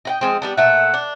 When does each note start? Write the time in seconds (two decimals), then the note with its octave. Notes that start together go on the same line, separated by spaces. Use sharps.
0.05 D#5 F#5 G5
0.21 F3 G#3 C4
0.42 G3 B3 D4
0.57 A#2 A3 E5 F#5
0.94 D4